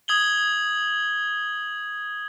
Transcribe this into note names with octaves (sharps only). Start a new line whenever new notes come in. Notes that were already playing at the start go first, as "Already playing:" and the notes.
D#6 G#6 F#7 G7